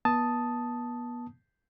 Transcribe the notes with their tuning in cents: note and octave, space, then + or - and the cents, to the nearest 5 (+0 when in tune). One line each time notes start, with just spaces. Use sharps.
B3 -35 A5 +0 D#6 +0